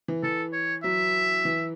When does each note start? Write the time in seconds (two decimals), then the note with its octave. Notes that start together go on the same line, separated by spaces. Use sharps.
0.08 E3
0.23 E3 A4
0.53 C#5
0.84 F#3 E5
1.45 E3